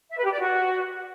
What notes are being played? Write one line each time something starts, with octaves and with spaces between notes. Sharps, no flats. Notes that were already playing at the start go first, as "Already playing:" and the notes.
E5
B4
G4
D5
F#4